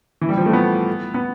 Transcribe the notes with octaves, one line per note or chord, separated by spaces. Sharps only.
E3
G3
F3
A3
B3
B3